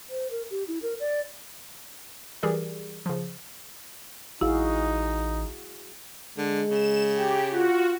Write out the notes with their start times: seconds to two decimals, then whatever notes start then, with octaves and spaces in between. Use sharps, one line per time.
0.10 C5
0.31 A#4
0.51 G4
0.68 E4
0.82 A#4
1.00 D5
2.43 E3 G3 G4 G#4 A#4 D5
3.06 C#3 F3
4.41 A1 D#4 E4 F#4 G#4 F5
6.37 D3 G#3
6.70 C#3 E7
7.17 G4 G5
7.51 F4 F#4